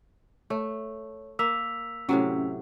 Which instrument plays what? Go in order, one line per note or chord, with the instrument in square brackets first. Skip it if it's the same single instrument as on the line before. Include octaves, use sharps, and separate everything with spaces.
[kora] A3 [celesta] C#5
[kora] A#3 [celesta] E6 B6 F7
[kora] A2 C3 F#3 [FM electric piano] C#4